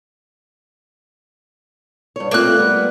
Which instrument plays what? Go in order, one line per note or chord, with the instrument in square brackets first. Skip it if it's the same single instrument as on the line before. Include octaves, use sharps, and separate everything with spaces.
[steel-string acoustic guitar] G2 C#5
[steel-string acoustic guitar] A3 C4 F4 [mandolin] A#3 F#6
[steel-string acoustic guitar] G3 B3